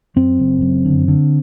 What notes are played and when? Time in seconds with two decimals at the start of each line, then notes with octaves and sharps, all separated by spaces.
0.16 F#2 C4
0.39 F#1
0.62 F#2
0.85 D3
1.08 D3